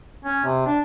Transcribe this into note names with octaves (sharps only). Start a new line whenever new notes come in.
C#4
C3
D4